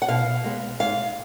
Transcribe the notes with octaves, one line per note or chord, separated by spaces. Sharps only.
F#5
B2 F5
G#3 B3
G#2 F5